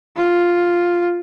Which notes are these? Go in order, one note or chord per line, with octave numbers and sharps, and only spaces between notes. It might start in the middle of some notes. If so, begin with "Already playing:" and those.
F4